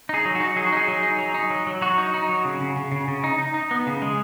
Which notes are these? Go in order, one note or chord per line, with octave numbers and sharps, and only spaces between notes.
D#4 G#4
F#3
D#4 F#4
F#3 G#4
F#4
D#4 G#4
F#3
D#4
F#3
D#4
F#3
F#3
F#3 F#4
D#4
D#4
F#3
C#3
C#3
C#3
C#3
C#3
D#4
D#4
D#4
B3
C#3
G#3